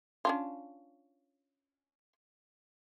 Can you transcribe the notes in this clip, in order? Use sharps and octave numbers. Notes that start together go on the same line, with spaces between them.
C#4 D4 F4